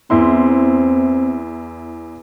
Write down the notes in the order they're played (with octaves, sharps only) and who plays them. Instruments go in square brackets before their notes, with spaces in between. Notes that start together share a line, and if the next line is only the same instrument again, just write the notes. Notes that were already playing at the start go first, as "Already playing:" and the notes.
[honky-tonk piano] E2 E4 C6 [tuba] C4